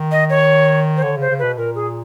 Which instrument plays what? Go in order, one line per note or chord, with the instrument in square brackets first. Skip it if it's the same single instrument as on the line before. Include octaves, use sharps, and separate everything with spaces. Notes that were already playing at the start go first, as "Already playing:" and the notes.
Already playing: [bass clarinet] D#3
[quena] D#5
C#5
C5
[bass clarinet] D3 [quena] C#5
[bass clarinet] C#3 [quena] C5
[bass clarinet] C#3
[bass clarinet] B2 [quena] B4
[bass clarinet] A#2 [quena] A#4
[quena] G#4